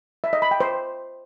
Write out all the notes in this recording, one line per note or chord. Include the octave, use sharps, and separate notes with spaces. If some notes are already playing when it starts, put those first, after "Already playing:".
E5
D#5
B5
G5
C5